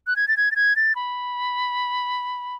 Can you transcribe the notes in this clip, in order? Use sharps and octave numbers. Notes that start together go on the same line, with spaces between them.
F#6
G#6
A6
G#6
A6
G#6
A6
B5